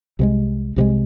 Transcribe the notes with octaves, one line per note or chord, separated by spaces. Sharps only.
C2 C3 E3 G#3
C2 C3 E3 G#3